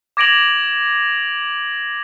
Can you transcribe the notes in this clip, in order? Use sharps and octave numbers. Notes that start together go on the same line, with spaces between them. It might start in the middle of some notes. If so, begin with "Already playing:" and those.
D6 G#6 A#6 D7 F7 F#7